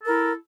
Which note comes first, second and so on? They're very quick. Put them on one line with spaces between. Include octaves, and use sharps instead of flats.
A4 A#4 E4